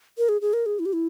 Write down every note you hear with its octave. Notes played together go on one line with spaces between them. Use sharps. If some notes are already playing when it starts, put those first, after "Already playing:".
A#4
G#4
G#4
A#4
G#4
E4
G4
E4